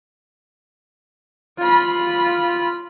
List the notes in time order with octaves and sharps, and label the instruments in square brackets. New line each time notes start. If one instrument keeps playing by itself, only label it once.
[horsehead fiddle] F4 B5